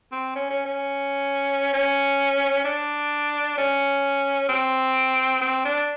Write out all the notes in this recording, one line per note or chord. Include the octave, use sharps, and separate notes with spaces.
C4
C#4
C#4
C#4
C#4
D4
C#4
C4
C4
D4